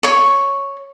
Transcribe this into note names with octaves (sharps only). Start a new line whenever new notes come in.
C#5 C#6